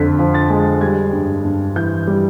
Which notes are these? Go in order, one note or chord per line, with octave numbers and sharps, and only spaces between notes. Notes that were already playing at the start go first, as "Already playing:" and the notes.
Already playing: F2 D3 B6
F3
A6
G#3
G3 G#6
G2
G2
E3 G6
G3